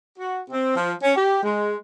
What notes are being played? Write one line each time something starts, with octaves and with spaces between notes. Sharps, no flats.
F#4
C4
F3
C#4
G4
G#3